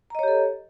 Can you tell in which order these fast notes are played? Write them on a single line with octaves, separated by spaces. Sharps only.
A#5 D#5 C#5 G4 A4